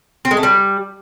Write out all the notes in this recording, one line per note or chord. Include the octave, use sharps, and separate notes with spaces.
C4
G#3
A3
G3